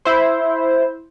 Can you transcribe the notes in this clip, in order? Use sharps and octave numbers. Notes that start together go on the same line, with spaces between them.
E4 C5